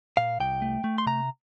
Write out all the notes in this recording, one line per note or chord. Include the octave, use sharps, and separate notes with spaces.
A#2 F5
C2 G5
A3
A3
C6
C3 A#5